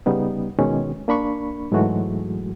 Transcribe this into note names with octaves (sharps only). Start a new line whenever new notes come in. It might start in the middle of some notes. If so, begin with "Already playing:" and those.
C#3 G3 B3 D#4
B2 D#3 G#3 C#4
A#3 D4 B5 C#6
G#2 E3 F#3 G#3 A3 F#4